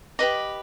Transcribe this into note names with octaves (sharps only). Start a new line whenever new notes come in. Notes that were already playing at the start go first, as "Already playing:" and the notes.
G4 B4 D#5 D6